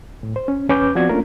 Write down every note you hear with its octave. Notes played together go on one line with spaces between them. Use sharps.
A2
C5
C#4
E2 C#4 B4 D6 G6
F3 B3 C4 F#4 D5 G#6
A3 A#3 C#4 D4 F4 A#4